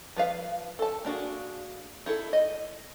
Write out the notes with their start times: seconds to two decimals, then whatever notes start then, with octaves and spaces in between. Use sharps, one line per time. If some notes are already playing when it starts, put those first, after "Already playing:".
0.16 F3 B4 F5
0.79 A4 A5
1.05 A#3 D4 F#4 G#4
2.06 D#4 E4 A4
2.33 D#5